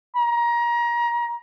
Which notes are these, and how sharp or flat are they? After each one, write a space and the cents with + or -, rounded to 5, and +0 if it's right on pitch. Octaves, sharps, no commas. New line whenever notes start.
A#5 +25